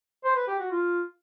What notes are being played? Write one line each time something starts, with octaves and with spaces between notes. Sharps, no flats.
C5
B4
G4
F#4
F4